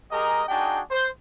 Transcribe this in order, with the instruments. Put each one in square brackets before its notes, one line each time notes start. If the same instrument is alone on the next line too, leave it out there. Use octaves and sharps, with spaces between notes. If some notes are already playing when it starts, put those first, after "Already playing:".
[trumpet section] G#3 G4 G#4 A#4 D#5 A#5
D4 D#4 F#4 G#4 G5 A5
C5